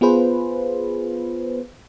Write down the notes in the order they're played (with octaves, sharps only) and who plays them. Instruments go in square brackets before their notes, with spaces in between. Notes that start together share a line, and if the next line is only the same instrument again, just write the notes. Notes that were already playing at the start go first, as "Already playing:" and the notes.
[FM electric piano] B3 F4 G#4 B4 C5